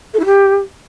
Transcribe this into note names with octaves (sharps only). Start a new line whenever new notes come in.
A4
E4
G4